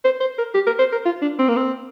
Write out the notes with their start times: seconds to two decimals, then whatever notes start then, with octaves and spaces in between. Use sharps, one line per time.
0.05 C5
0.20 C5
0.38 A#4
0.54 G4
0.67 A#4
0.79 C5
0.92 A#4
1.05 F4
1.22 D4
1.39 C4
1.48 A#3
1.56 C4